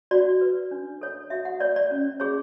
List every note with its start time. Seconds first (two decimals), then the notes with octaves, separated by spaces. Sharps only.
0.11 F#4 D5
0.41 B4
0.71 D4
1.01 A4 C#5
1.30 F#4 E5
1.45 F#5
1.60 C#5 D5
1.76 D5
1.91 C#4
2.20 G#4 C#5